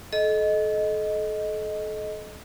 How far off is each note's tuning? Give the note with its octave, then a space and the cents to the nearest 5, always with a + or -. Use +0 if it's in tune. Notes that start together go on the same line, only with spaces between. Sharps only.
A4 -35 D#5 +0